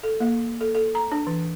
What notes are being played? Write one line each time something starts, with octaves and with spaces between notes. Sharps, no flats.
A4
A#3
A4
A4
A#5
D4
E3